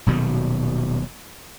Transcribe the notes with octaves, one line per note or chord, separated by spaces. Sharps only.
D#1 B2 D#3 F#3